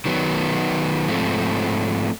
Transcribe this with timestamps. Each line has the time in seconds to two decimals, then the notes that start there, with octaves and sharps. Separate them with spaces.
0.05 D#3 F#3 B3
1.08 G#2 F3 A3 C4